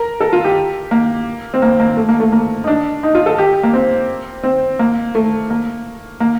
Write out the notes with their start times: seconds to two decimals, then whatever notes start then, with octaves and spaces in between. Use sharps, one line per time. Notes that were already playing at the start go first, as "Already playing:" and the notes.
Already playing: A#4
0.20 A4
0.33 F4
0.44 G4
0.91 A#3
1.54 C4
1.62 A#3
1.80 A#3
1.97 A3
2.09 A#3
2.20 A3
2.32 A#3
2.64 D#4
2.67 D4
3.03 D#4
3.15 F4
3.26 A4
3.38 G4
3.63 A#3
3.73 C4
4.43 C4
4.79 A#3
5.15 A3
5.50 A#3
6.20 A#3